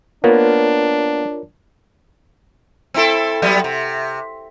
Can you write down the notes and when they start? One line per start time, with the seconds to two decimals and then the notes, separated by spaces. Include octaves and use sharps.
0.24 A#3 B3 D4 F4 A#4 C#5
2.94 C4 E4 A4
3.42 F#3 G3 B3
3.64 C3